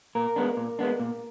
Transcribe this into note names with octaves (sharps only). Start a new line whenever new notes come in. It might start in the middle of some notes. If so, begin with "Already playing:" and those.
A#2 A#4
G#3 B3 D4
A#2
G#3 B3 D4
A#2